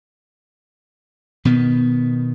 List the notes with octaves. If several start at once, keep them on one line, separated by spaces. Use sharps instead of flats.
B2 D#3 B3